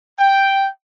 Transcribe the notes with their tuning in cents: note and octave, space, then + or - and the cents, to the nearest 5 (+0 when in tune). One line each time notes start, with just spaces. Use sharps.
G5 +0